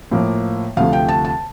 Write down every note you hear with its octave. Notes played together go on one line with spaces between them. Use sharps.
A2 F3 A#3
D2 C3 F3 A3 F5
G5
A5
A5